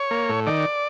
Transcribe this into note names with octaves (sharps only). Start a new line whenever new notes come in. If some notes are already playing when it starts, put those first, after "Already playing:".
Already playing: C#5
A#3
A2
D#3 D5